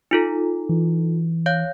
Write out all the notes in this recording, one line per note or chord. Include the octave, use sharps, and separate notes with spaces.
D#4 F4 A4
E3
C#5 F5 G6